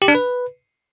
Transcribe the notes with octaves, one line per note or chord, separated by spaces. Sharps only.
G4
D4
B4